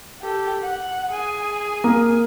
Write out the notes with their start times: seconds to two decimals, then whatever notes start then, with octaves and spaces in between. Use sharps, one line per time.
0.22 G4 A4
0.61 F#5
1.10 G#4 G#5
1.84 A#3